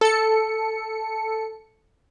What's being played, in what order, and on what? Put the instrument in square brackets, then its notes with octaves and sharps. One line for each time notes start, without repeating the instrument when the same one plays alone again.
[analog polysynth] A4 C#7